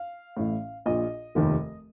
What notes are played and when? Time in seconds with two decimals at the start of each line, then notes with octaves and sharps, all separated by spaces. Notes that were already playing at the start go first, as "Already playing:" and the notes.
Already playing: F5
0.37 A1 A2
0.86 A#1 A#2 D#5
1.35 F1 D#2 D#3